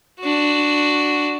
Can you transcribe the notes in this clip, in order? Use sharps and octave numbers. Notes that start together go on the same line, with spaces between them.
D4 F#4